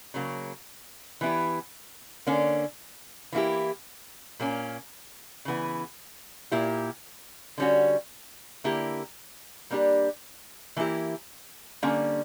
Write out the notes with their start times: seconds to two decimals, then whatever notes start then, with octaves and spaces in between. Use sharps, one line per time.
0.14 C#3 F#3 A#3
1.21 E3 B3 E4 G4
2.27 D3 A#3 C#4
3.32 E3 A#3 E4 G4
4.39 A#2 A#3 C#4
5.45 C#3 E3 B3
6.51 A#2 A#3 E4 G4
7.58 D3 G3 C#4 F#4
8.64 D3 A#3 E4 G4
9.70 G3 A#3 D4 G4
10.76 E3 A#3 E4 G4
11.82 D3 G3 A#3 C#4